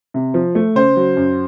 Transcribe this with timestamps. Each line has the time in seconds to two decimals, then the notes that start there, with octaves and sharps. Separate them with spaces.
0.14 C3
0.34 F3
0.55 A3
0.75 C#3 C5
0.96 F#3
1.17 F#2